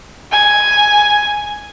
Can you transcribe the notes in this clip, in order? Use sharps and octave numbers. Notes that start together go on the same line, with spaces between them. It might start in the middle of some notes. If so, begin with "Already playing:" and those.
G#5